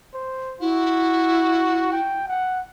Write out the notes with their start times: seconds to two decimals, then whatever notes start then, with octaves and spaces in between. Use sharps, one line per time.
0.14 C5
0.61 E4 F#4
1.92 G5
2.28 F#5